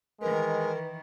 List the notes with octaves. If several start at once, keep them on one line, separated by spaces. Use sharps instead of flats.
D#3 E3 G#3 A#4 B4